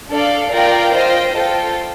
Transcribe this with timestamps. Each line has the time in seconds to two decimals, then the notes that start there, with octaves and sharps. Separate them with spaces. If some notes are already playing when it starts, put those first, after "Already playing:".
0.10 D4 A4 D5 F5
0.52 F4 A#4 D5 G5
0.92 F4 C5 D#5 G5
1.35 F4 A4 C5 G5